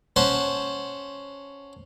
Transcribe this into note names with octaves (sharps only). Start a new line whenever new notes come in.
C#4 C5 F#5 A5